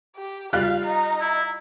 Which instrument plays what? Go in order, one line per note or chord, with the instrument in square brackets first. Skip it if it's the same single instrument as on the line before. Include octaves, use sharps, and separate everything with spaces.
[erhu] G4
[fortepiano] G3 F4 F#6 [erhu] F5
[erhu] D#4
[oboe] E4